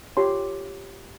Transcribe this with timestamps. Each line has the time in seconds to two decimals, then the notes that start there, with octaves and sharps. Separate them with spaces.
0.17 F4 G4 C#5 C6